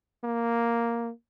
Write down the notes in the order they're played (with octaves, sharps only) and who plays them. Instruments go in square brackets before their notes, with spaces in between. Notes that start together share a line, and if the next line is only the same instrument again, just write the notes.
[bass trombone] A#3